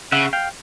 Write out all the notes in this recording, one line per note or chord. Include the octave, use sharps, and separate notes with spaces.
C#3 E5 F#5
F5 G5